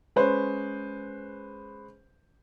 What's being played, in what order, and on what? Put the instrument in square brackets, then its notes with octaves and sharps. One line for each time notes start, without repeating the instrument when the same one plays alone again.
[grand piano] G#3 C#4 B4 C5